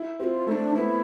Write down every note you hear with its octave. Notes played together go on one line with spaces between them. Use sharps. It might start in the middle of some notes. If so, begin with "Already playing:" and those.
Already playing: E4
C4 F4 G4
A3 E4
D4
B3 E4